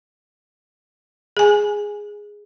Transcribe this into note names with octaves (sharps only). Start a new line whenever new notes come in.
G#4 G#5